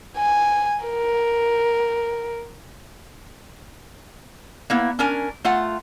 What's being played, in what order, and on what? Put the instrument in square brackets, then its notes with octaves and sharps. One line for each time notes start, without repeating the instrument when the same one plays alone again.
[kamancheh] G#5
A#4
[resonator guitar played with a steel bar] A#3 B3 E4
C#4 D4 A#4 G#5
A3 F4 F#5